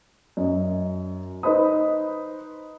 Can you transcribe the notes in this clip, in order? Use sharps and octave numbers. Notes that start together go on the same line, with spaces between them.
F#2 D#5
D#4 B4 C5 D#5 B5 D#6